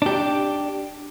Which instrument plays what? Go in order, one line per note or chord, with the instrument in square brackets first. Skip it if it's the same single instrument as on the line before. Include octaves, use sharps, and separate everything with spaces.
[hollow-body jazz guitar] D4 G4